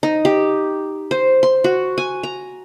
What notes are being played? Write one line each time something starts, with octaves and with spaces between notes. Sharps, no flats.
D#4
G4
C5
C6
F#4
G#5
A#5